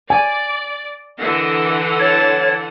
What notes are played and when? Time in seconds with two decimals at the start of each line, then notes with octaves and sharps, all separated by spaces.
0.10 D5 G#5
1.20 D3 E3 A#4 D#5 F#5
1.99 C#5 A5